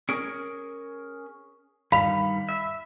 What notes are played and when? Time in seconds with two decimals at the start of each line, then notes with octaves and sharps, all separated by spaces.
0.09 C#4 G#4 A#4 D7
1.92 G2 D#3 G3 F5 B5 F7
2.49 E5